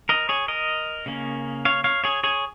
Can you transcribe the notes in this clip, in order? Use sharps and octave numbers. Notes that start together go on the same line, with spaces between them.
A#4 D#5
G#4 C#5
A#4 D#5
C#3 A#3 C#4
C#5 F5
C#5 F5
G#4 C#5
G#4 C#5